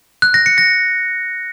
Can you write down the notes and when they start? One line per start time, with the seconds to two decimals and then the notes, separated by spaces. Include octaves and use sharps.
0.22 F#6
0.34 A#6
0.46 C#7
0.58 A#6